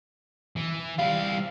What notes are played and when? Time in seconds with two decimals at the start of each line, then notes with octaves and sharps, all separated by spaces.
0.56 E3
0.98 G3 E4 F5